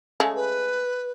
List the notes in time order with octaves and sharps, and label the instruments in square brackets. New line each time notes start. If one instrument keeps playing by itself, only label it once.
[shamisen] C#3 G#3 A3
[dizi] B4